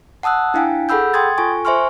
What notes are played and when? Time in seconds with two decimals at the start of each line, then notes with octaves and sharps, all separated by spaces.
0.23 F#5 A5 D#6 E6 F#6
0.54 D4 E4 F5 G5 G#5
0.89 G#4 A4 F#5 B5 E6 G6
1.14 G5 C6 D#6 G#6 A6
1.38 F4 A4 G#5 C#6
1.65 C5 E5 G#5 C6 C#6 F6